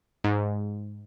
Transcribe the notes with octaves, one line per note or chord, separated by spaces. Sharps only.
G#2